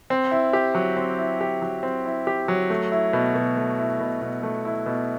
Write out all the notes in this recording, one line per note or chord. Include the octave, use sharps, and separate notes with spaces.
C4
E4
G4
F#3
C4
E4
G4
F#3
C4
E4
G4
F#3
A3
E4
B2
B2
A3
E4
B2
B2
A3
E4
B2